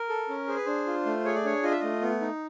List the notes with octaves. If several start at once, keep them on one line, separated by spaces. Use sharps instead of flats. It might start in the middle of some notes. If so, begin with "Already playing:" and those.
Already playing: A#4
A4
C#4
G#4 C5
B4
D4 C5
F4
A3
G#4 C#5
D5
D4 C#5
F4 D#5
E5
A3 D#5
B3
D#4